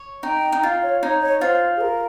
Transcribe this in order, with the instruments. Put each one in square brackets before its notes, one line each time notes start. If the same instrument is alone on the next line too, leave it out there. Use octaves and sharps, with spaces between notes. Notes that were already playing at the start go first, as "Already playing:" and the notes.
Already playing: [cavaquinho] C#5
[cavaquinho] D#4 [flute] G5
[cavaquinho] D#4
[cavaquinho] F4 [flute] F5
[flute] C#5
[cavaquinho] D#4 [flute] C#5
[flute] C#5
[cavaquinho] F4 [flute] C5
[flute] G#4
A#4